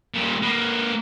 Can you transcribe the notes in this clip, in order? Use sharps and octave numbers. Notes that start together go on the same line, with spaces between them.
A#2 G3
A#3 B4